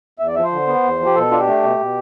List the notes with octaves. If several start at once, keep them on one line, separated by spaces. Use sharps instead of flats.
E2 E5
D5
F3 E5
C5
D3
B3
E2
F3
G4
B2 A4
D4 F4
G4
A3
B2
B2